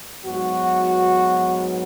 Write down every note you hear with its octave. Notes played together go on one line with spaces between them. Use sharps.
G#2 F#3 B3 F#4